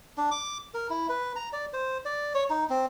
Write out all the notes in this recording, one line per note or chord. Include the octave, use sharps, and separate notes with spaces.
D4
D6
A#4
E4
B4
A#5
D5
C5
D5
C#5
D#4
C4